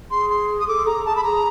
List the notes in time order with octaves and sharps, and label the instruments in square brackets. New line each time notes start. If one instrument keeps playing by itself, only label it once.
[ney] G#4 [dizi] C6
[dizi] C6
D#6
[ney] A4 [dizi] D6
[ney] G#4 [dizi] A#5
[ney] G#4 [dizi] A5
[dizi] B5
[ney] G#4 [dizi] A#5